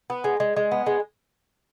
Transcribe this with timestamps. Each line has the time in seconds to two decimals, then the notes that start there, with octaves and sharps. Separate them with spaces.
0.10 B3
0.24 G#3
0.40 G#3
0.57 G#3
0.72 B3
0.86 G#3